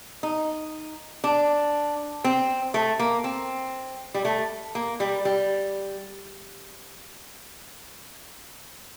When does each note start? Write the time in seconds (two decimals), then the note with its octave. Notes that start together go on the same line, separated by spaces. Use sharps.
0.23 D#4
1.24 D4
2.24 C4
2.74 A3
2.99 A#3
3.24 C4
4.14 G3
4.25 A3
4.75 A#3
5.00 G3
5.25 G3